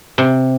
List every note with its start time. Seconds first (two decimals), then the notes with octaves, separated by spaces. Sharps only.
0.18 C3